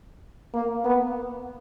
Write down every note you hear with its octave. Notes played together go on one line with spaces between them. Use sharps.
A#3
B3